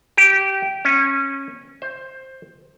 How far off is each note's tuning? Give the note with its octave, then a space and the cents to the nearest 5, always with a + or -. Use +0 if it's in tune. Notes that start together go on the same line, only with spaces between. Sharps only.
G4 -20
C#4 -20
C5 +10